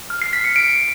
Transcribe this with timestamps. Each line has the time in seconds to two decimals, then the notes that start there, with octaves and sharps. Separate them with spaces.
0.10 F6
0.22 C7
0.33 B6
0.44 C#7
0.56 D7